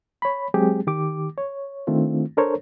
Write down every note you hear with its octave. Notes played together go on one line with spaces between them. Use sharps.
C#5 B5
F#3 G#3 C4 G4 G#4
D#3 G4 D6
C#5
D#3 A3 C4 D4 F4
D4 A4 A#4 C5 C#5